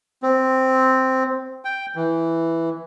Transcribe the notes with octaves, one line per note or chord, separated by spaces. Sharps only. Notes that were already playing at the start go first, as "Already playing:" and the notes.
C4
G5
E3